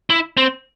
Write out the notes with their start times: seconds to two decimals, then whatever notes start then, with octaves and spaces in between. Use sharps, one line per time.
0.10 E4
0.37 C4